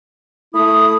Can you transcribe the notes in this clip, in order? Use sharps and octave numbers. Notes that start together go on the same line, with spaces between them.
A3 E4 D#6